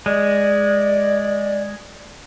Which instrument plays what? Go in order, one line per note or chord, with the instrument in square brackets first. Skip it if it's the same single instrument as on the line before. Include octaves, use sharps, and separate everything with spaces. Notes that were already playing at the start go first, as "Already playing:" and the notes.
[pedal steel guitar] G#3 [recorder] D5